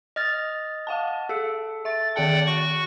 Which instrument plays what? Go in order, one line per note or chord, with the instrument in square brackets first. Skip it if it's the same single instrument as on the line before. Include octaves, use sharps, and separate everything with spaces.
[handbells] D#5 F6 A6
[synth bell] F5 F#5 A5
[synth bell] G#4 C#7 [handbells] A4
[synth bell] E5 [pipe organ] A6
[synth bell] D#3 G#4 A5 [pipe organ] D5 F#5 G5
[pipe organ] F#4 C#6